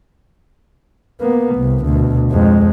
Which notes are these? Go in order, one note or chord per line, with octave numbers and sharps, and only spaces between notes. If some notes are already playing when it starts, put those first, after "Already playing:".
A#3 B3
C2
D2 B2
F2 G#3